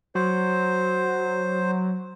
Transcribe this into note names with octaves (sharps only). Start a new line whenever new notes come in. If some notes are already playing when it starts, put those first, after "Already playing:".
F#3 C5